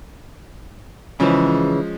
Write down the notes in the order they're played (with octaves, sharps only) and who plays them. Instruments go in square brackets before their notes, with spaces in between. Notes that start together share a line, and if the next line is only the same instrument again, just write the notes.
[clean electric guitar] C#3 E3 [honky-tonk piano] F3 G#3 C#4